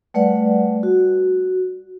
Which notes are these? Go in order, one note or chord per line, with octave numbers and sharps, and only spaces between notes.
G3 A3 B4 D5 F#5
F#4